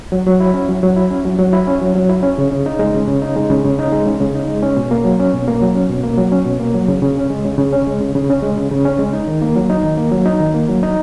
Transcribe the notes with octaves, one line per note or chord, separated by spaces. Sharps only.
F#3
F#3
E4
C#4
F#3
F#3
E4
C#4
F#3
F#3
E4
C#4
F#3
F#3
E4
C#4
C#3
C#3
D#4
G#3
C#3
C#3
D#4
G#3
C#3
C#3
D#4
G#3
C#3
C#3
D#4
G#3
C#4
B2
A#3
F#3
C#4
B2
A#3
F#3
C#4
B2
A#3
F#3
C#4
B2
A#3
F#3
C#3
C#3
C#4
G#3
C#3
C#3
C#4
G#3
C#3
C#3
C#4
G#3
C#3
C#3
C#4
G#3
D#4
D#3
A#3
F#3
D#4
D#3
A#3
F#3
D#4
D#3
A#3
F#3
D#4